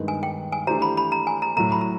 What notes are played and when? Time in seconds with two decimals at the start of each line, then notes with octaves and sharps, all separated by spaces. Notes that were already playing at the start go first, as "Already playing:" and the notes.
Already playing: G2 D#3 G#3 B3 D#4
0.08 G#5
0.23 G5
0.52 G#5
0.67 E3 A3 D4 G4 C5 A#5
0.82 B5
0.97 B5
1.12 A#5
1.27 G#5
1.42 A#5
1.57 A2 F#3 A3 A#5
1.72 B5
1.81 A#5